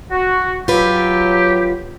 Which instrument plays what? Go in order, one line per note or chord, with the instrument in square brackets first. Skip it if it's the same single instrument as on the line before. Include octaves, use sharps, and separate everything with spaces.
[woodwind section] F#4
[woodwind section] F#3 G4 [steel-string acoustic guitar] F4 B4